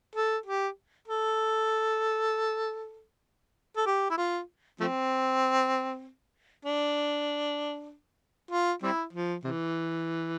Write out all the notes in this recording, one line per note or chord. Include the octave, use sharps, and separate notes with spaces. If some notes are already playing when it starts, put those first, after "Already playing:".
A4
G4
A4
A4
G4
E4
F4
F3 A3 C4
D4
F4
G3 C4 E4
F3
C3 E3